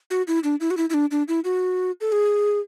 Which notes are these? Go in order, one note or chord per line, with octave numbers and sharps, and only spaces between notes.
F#4
E4
D4
E4
F#4
E4
E4
D4
D4
E4
F#4
A4
G#4